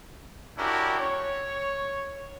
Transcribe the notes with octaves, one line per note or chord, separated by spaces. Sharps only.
C#4 D4 E4 F#4 G4 A#4
C#5